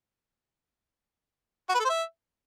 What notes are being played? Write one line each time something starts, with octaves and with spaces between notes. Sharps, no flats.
F#4
B4
A4
C5
E5